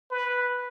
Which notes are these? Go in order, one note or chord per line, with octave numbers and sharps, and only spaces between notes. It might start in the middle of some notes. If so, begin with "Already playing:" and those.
B4